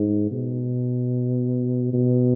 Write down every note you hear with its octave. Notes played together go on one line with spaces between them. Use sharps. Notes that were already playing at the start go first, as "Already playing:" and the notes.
Already playing: G#2
B2
B2